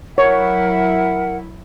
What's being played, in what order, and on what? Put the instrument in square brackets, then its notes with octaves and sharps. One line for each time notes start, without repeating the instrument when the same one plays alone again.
[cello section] F#3 E4 [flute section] A#4 F#5 [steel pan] C#5